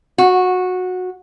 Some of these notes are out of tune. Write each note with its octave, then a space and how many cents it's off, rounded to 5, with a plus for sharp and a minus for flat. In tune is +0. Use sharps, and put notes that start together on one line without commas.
F#4 -15